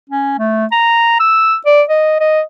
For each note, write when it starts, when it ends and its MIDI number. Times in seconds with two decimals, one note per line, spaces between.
0.10 0.34 61
0.39 0.66 57
0.72 1.15 82
1.20 1.56 88
1.66 1.82 74
1.89 2.16 75
2.20 2.41 75